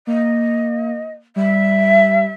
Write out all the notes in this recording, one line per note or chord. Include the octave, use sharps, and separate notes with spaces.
A#3 D#5
G3 E5